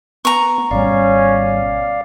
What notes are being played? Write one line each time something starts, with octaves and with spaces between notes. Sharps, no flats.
B3 A#5 C#6
G#1 B2 G3 C#4 D5 F5